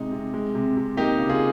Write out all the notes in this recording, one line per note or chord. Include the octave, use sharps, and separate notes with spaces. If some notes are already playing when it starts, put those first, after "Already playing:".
Already playing: C3 G#3 D#4
C3
G#3
C3
C3
A#3 D#4 G4
C#3
F4 G#4